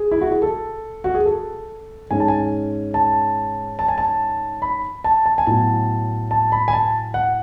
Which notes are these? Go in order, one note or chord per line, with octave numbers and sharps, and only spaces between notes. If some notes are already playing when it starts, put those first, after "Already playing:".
Already playing: G#4
E4
F#4
G#4
A4
F#4
G#4
A4
G#2 G#3 C#4 G#5
A5
G#5
A5
A5
G#5
A5
B5
A5
A5
G#5
A2 F#3 B3 A5
A5
B5
G#5
A5
F#5